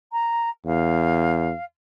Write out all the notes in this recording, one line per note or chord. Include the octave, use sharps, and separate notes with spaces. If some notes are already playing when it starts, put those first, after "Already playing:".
A#5
E2 F5